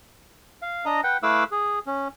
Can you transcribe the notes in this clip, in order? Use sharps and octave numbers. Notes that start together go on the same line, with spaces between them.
F5
D4 D#5 A#5
B4 F#5 G5
A3 E4 B4 F5 D6 E6
G#4
C#4